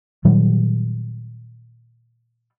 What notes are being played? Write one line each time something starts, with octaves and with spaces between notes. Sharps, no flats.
A#2 D#3 F#3 G3